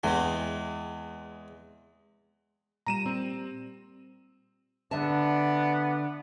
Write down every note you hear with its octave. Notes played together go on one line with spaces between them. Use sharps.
E2 G#3 C4
A#2 G3 A#5 D#7 E7
C4
D3 B3 D5 E5 A5